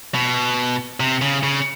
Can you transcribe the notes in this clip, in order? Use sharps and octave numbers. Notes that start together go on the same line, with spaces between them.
B2
C3
C#3
C#3